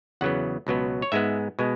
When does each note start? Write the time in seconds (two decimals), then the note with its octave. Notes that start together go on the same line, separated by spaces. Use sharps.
0.21 E2 C#3 F#3 B3 F#5
0.67 C#2 B2 F#3 B3
1.02 C#5
1.12 G#2 G#3 B3 E5
1.59 B2 G#3 B3